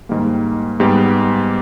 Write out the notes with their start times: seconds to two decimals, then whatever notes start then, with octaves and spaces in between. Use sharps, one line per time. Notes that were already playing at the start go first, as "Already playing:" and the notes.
0.09 G#2 D#3 G3 A#3
0.80 G#2 G3 B3 G4